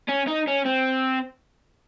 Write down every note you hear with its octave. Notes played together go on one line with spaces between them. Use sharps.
C#4
D#4
C#4
C4